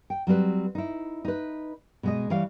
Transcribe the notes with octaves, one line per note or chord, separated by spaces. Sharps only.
G5
F#3 G3 C4 B4
D#4 E4
D#4 B4
B2 G#3 D#5
E3 G3 C#5 F5